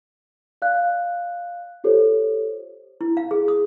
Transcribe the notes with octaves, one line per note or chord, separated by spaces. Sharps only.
D5 F5 F#6
F4 G4 A4 C5 C#5
E4
F5
G#4
D#6